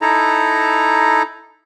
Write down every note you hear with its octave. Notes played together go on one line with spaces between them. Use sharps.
D#4 E4 A4 A#5